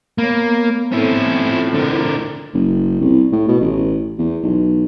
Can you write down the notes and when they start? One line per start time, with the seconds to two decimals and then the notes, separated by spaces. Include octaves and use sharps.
0.18 A#3 B3 C#5
0.92 A2 C4 C#4 E4
1.52 F4
1.74 D3 A#4
2.54 F#1
3.01 C2
3.32 A2
3.48 B2
3.61 A1
4.19 E2
4.43 B1